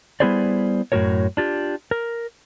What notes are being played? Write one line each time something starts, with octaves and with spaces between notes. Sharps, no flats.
G3 B3 E4 G#4 C5 D5
F#2 A2 G#3 F#4 A#4 C#5
D4 F4 G4
A#4